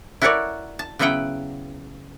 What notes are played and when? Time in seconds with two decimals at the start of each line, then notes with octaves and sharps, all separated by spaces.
0.22 E4 F#4 A4 A#4 C#5 D5
0.79 A5
0.99 C#3 F#3 B3 E4 F#5 G5